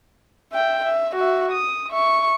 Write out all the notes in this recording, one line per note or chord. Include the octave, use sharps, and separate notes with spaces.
E5 G5
E5
F#4 E5
D#6
E5 C#6